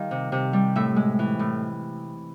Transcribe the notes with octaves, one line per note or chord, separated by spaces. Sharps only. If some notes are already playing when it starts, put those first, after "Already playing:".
Already playing: D#3 G3 F5
C3
C3
G3
A2 E5
G#3
E3
A2